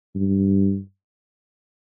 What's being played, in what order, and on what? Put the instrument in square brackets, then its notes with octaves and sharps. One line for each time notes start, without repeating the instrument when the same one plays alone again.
[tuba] G2